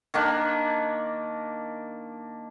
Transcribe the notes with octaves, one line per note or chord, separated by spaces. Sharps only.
D#3 A#3 D4